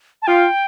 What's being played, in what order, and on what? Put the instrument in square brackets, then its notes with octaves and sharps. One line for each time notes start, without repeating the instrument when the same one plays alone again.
[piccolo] A5
[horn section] F4 [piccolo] G5